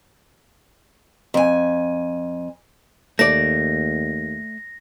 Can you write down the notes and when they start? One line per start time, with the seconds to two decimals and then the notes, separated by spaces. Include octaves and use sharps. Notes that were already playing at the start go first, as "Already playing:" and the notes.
1.34 F2 G#5
3.19 D#2 A3 D5 A#6